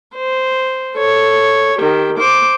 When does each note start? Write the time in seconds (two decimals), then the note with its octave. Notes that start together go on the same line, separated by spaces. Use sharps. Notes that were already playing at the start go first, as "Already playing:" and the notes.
0.15 C5
0.96 A4 C#5
1.78 D#3 G4
2.18 C5 D6